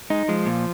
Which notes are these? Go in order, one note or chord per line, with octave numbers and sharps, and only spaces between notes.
G#3 D#4
F3 G#3
A#2